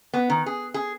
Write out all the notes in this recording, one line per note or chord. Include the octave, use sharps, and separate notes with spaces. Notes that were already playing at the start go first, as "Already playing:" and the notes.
B3
D#3
G#4
G#4